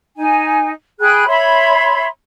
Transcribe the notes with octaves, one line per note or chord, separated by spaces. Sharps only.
D#4 G#5
G#4 G5 B5 F#6
C#5 E5 B5 C6